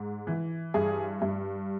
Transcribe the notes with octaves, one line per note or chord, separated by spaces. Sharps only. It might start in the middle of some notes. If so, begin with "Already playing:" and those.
Already playing: G#2
E3
G2 G#4
G2